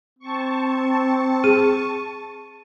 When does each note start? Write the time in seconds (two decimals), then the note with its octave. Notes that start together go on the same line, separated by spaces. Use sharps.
0.19 C4 A5 C#6
1.44 G#4 D#7